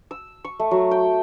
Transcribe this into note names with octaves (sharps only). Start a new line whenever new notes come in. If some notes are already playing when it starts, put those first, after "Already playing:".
E6
C#6
A3
F#3
G5